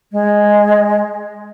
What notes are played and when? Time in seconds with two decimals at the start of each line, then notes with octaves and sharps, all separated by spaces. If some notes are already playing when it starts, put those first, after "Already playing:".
0.12 G#3